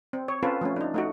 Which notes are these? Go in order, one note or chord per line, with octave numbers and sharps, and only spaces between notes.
C4
C#5
C4 C#4 F4 A4 B4
F3 A3 C#4
D4 D#4
A3 D#4 F#4